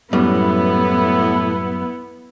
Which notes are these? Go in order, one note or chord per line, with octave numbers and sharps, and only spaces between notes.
F#2 A2 G3 B3 E4